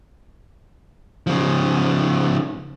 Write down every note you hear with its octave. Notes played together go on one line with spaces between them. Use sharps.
C#3 F3